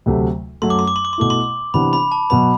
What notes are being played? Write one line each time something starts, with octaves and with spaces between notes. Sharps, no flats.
D2 C3 F#3 A3
F#2 F#3 A3 C6
D6
C6
D6
C6
D6
C6
B2 A3 E4 D6
C6
C3 E3 B3 D4 B5
B5
A5
B2 F#3 B3 B5